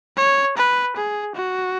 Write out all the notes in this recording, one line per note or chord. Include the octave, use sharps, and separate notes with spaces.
C#5
B4
G#4
F#4